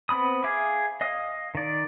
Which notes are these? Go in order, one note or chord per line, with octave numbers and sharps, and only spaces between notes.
B3 C4 B5 D#6
G#4 E5 F5 D6
D#5 F5 D#6
D#3 D5